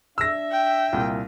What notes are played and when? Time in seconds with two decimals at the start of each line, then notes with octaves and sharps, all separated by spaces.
0.18 D4 E5 E6 A#6
0.52 G5
0.93 C2 A#2